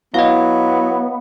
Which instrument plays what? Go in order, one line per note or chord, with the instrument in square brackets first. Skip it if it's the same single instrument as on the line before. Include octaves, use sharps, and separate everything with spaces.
[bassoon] F#3 [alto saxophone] B3 [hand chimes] E4 [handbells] D#5 F5